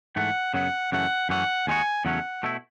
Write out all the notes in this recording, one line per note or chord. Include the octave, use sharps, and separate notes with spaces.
G#2 E3 A3 F#5
F#2 C#3 F#3 B3 F#5
F#2 C#3 E3 A3 F#5
F#2 E3 A3 C#4 F#5
D#2 D#3 G#3 D#4 F#4 G#5
E2 C#3 F#3 A3 C#4 F#5
B2 A3 E4